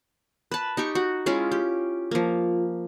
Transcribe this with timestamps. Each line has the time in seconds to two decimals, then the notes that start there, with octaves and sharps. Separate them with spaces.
0.51 B4 A5
0.77 D#4 G4 C#6
0.95 F#4
1.26 G#3 C#4 E4 F4
1.52 G4
2.11 F3 A#3